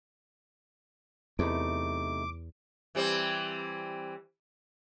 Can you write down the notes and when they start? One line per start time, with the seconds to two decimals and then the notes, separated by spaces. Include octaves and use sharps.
1.39 E2 C3 A3 D#4 D6
2.95 E3 G3 C4